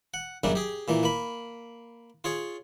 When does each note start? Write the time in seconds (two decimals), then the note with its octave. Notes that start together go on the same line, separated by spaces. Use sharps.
0.14 F#5
0.44 F#2 C#3 G3 A#3 D4
0.55 G4 G#4
0.88 A#2 E3 A#3
1.03 A#3 B5
2.24 F4 G#4 C#5